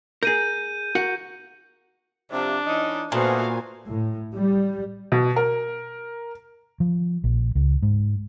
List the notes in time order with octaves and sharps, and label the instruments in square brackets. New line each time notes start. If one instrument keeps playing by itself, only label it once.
[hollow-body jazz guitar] G#4 A#4 [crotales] G6 D#7
[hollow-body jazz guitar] F#4 A#4 F#5
[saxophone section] C3 F3 [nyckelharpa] D4
[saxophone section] E3 C#4 D#4
[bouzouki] A#2 [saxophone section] A3 B3 [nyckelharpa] F#4 F5 [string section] A#4 C5 G#5
[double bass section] A2
G3
[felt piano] B2
A#4
[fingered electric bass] F3
A#1
C#2
G#2